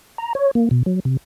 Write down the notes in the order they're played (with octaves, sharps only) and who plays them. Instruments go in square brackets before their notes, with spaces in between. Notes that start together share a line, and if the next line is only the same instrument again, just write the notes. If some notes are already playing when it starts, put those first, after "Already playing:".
[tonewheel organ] A#5
C#5
A#3
B2
F#3
C3